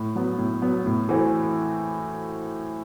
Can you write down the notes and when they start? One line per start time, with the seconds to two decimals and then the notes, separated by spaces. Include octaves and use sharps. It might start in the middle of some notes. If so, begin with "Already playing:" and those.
Already playing: A2
0.15 F#3 B3
0.38 A2
0.62 F#3 B3
0.86 A2
1.09 E3 A3 C4 F#4